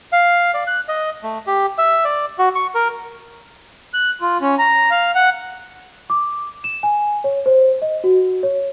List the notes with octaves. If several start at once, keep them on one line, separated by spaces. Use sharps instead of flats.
F5
D5
F#6
D#5
A3
G4
E5
D5
F#4
C#6
A#4
F#6
F4
C#4
A#5
F5
F#5
D6
E7
G#5
C#5
C5
D#5
F#4
C#5